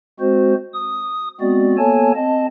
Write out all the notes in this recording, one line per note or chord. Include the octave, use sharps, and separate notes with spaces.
G#3 C4 F#4 C5
D#6
G#3 B3 C4 F#4 D5
A#3 B3 A4 C#5 G#5 A5
C4 D#5 A5